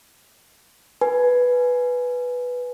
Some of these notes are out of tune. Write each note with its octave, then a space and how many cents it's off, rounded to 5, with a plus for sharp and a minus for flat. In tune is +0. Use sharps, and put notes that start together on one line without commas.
B4 +0 G#5 +10